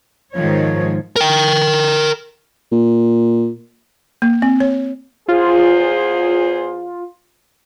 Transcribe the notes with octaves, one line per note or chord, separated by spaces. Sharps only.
G#2 D#3 F3 C#5
A#4 G5
A#2
A#3
C4
C#5
E2 F4 G#4 C5